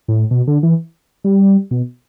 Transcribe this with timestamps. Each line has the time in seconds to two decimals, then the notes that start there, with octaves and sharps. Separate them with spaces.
0.08 A2
0.31 B2
0.47 D3
0.63 E3
1.24 G3
1.71 B2